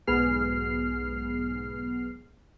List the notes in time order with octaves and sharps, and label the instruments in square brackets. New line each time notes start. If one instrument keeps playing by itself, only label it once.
[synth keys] B1 G#2 B3 G#4 F6 C7